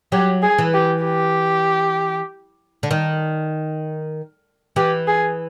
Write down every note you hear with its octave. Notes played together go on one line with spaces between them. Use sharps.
F#3 G4
G#4
E3
G4
G4
D3
D#3
E3 G4
G#4